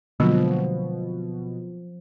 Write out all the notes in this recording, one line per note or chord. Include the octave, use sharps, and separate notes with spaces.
B2 D3 F3 F#3 G#3 A#3